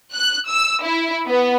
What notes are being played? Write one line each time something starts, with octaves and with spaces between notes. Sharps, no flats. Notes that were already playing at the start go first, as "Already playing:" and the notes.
F#6
E6
E4
B3